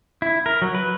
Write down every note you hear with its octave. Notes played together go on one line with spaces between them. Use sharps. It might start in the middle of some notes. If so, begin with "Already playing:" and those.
E4
A#4
F#3
B4